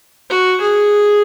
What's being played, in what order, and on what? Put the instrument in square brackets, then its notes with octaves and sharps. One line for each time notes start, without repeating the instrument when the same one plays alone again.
[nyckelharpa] F#4
G#4